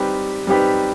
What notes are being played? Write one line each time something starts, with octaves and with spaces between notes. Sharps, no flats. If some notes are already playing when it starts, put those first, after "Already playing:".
Already playing: G3 C4 D#4 G4 B4
G3 C4 D#4 G4 B4